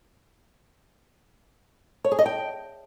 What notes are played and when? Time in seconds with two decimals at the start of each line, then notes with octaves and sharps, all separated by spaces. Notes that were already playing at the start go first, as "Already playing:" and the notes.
2.04 C#5
2.11 G#4
2.19 D#5
2.26 G5